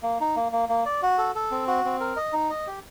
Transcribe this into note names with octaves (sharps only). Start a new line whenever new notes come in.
A#3
D#4
A#3
A#3
A#3
D5
F#4
A4
A4
C4
F#4
C4
A#4
D#5
D#4
D#5
G4